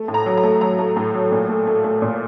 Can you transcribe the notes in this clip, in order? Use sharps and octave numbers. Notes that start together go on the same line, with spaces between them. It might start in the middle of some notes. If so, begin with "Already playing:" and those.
Already playing: A3
A2
A#5
F#3
A#5
A3
F#3 A#5
A3
A2
F#3
A#2
A3
A3
A3
A#2